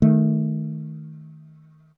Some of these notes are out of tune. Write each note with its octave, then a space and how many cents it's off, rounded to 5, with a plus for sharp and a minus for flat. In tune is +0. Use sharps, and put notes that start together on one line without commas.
D#3 +0 A3 -15